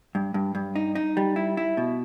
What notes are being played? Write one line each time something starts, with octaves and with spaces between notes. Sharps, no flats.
G2
G2
G2
D#4
D#4
G3
E4
E4
B2